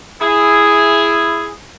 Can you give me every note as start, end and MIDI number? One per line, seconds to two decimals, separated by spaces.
0.21 1.51 64
0.21 1.51 68